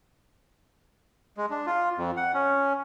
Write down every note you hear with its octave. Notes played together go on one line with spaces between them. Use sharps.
G#3
D4
F4
F2
F#5
C#4